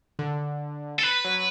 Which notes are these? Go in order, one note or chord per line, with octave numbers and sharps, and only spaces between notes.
D3
A4
B4
F#3